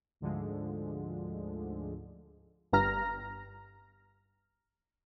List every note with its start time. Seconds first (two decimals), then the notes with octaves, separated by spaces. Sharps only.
0.20 D2 G#2 D3 F3 G#3
2.73 G1 G2 A#5 F6 A#6